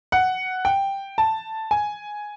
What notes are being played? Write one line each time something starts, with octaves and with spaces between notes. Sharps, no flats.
F#5
G5
A5
G#5